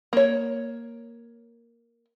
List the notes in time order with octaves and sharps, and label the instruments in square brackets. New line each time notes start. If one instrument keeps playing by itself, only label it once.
[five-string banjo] A#3 C#5